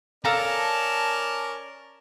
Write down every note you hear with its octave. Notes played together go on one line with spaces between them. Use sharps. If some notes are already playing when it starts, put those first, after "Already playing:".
C#4 A4 A#4 D5 F5 A5 A#5